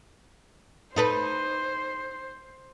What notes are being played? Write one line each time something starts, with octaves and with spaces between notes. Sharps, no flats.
D#4 A4 B4 C5